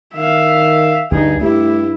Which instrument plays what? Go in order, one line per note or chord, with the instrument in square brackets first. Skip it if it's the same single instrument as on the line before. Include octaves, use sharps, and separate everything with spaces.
[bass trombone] D#3 [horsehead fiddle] E5 F5
[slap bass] D2 [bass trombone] G2 [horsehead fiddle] D#4 G#4
[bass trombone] G2 [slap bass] A3 [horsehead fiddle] E4 [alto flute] G4